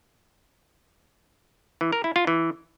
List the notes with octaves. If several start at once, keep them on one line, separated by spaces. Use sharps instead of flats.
E3
A#4
E4
F4
E3